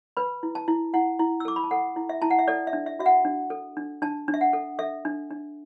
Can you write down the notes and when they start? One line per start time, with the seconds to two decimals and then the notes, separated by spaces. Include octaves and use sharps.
0.17 B4 B5
0.43 E4
0.55 A5
0.68 E4
0.94 E4 F#5
1.19 E4
1.40 E6
1.45 A4 D6
1.56 B5
1.64 A5
1.71 A4 F#5
1.96 E4
2.09 E5
2.22 E4 A5
2.30 F#5
2.39 E5
2.48 A4 D5
2.67 E5
2.73 D4
2.86 E5
2.99 F#4 E5
3.06 F#5
3.25 D4
3.50 A4
3.77 D4
4.02 D4 A5
4.28 D4
4.34 E5
4.41 F#5
4.53 A4
4.79 A4 E5
5.05 D4
5.30 D4